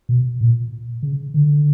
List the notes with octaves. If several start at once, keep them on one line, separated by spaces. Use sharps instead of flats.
B2
A#2
C#3
D3